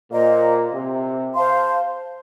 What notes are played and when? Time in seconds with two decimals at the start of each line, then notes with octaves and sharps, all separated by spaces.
0.11 A#2 C5 D#5 A#5
0.73 C3
1.34 C5 F5 A5 C6